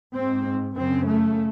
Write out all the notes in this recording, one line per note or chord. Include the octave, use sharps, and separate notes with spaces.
G#2 C4
F#2 C#3 C4
A3